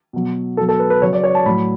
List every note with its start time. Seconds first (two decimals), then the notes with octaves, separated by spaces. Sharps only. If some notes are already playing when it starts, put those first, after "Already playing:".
0.13 B2 F#3
0.57 B2 F#3 A4
0.69 A4
0.79 B4
0.90 B4
1.02 C#3 F#3 C#5
1.13 D5
1.24 C#5
1.35 A5
1.46 A2 F#3 B5